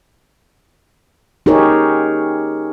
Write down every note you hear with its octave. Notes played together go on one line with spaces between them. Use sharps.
D#4 G4 G#4 A#4 C#5